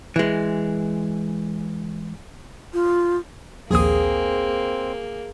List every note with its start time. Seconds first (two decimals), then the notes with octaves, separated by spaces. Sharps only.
0.16 E3 G#3
2.73 F4
3.71 A#1 D#2 A#3 C4 G#4 D#6